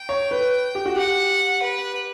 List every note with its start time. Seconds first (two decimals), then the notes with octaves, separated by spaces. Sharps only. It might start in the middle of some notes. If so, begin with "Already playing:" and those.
Already playing: G5
0.09 C#5
0.31 B4
0.75 G4
0.86 F#4
0.96 G4 F#5
1.62 B4